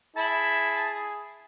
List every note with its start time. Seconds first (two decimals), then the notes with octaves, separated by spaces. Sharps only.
0.16 E4 G#4 A5